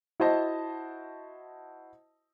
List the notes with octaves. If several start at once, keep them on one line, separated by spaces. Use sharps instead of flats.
E4 F#4 C5 D#5 A5